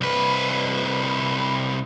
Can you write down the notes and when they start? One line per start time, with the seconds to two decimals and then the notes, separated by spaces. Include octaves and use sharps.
0.01 C2 B4